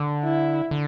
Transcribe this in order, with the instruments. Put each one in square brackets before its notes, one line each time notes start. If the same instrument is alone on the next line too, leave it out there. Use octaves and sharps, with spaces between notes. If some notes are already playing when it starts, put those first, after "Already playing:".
Already playing: [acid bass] D3
[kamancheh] E4
[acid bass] D3